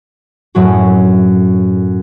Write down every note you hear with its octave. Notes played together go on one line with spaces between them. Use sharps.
F#2 A2 F#3 F#4